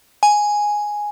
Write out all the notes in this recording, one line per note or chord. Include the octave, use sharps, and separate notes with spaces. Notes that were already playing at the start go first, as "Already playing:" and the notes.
G#5